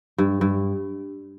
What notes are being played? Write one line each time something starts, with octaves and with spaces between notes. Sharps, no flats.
G2
G2